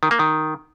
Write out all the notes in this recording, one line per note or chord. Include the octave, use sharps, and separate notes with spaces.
D#3
A#3
D#3